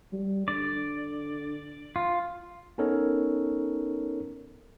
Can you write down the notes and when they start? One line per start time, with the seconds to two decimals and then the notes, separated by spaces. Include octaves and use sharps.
0.13 G3
0.48 D3 D5
1.96 F4
2.78 B3 C#4 D#4 A4 A#4 C#5